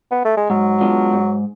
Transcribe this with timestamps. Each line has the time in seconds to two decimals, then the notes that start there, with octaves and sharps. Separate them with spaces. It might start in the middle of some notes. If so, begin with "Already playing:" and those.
0.11 B3
0.25 A3
0.37 G#3
0.50 G#2 F#3
0.81 G#3 B3 D4 F4
1.13 G#2